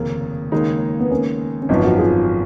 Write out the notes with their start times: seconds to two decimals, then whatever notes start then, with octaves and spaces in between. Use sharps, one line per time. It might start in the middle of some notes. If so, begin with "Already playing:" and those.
Already playing: F1 D#2 C#3 A#3
0.52 D#2 C#3 G#3 A#3 D#4
1.00 B3
1.11 A#3 C#4
1.62 C#4
1.69 G#1 F#2 F3 B3 D#4
1.85 D#4 F#4
1.98 F4 G#4